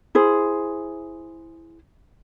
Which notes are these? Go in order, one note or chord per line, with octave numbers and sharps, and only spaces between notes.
E4 G#4 C5